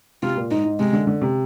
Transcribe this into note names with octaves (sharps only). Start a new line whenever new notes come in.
C3 F4
A#2
G#2 D#4
G#2
C3 G#3
D3
D3
C3